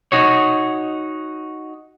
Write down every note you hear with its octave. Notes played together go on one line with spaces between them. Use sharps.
D#4 F#4 C#5